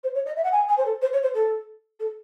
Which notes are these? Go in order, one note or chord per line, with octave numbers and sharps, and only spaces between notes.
C5
C#5
D#5
E5
F#5
G#5
G#5
C5
A4
C5
C#5
C5
A4
A4